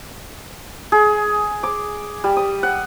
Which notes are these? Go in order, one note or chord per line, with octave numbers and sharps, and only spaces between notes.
G#4
D6
G3
D#6
F#5